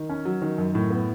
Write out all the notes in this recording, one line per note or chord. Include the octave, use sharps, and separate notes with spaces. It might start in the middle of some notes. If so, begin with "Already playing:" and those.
Already playing: D#3
C#4
F#3
D#3
F#2
A2
B3